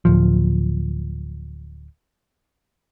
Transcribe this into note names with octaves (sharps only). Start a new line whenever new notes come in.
D1 F3